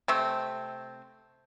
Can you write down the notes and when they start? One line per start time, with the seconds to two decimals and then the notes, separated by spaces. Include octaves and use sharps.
0.08 C3 A3 C4